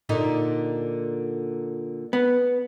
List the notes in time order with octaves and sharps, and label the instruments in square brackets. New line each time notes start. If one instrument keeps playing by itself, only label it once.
[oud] A#2 D3 D#4
[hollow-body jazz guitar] B3